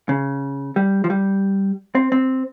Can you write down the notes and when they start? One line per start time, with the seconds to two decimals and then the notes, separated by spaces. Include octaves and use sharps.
0.09 C#3
0.76 G3
1.04 F3
1.10 G3
1.95 C4
2.12 C4